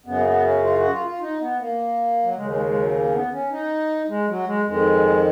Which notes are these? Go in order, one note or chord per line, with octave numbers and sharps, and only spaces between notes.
F#2 C#3 B3
A#3
B3
C#4
F4
F#4
F4
F4
D#4
B3
A#3
F#3
D#2 C#3 G#3
G#3
G#3
F#3
A#3
C#4
B3
C#4
D#4
G#3
F#3
G#3
F2 D#3 G#3